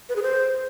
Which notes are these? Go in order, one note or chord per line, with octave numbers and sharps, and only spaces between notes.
B4
G#4
C5